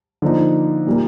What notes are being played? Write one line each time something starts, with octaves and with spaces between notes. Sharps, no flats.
D3 F3 A#3 D#4
A#2 G3 A#3